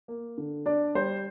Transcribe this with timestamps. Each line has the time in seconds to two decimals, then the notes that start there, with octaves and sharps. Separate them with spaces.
0.08 A#3
0.38 D3
0.66 D4 D5
0.95 G3 C5